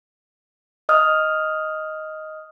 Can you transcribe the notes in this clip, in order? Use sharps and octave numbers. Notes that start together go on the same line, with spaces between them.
D#5 D#6 F6